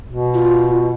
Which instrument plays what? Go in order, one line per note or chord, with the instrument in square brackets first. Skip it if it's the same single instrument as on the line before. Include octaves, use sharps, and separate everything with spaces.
[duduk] B2
[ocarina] F4